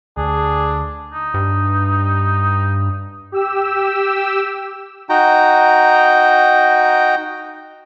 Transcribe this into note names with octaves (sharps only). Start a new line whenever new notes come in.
D2 D4 G#4
D#4
G2
G4 E6
D#4 F#4 G5 A#5